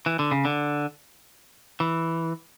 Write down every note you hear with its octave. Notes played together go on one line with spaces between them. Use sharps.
E3
D3
C#3
D3
E3